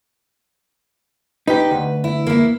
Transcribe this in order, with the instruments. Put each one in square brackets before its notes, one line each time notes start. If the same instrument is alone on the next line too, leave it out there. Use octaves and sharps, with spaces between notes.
[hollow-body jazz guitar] D#4 G4 [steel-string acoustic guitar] B4
[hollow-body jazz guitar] D2
[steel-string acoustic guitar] E4
A#3 E4